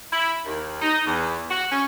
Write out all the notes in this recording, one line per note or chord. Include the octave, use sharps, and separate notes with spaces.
E4
D#2
D#4
E2
F#4
C#4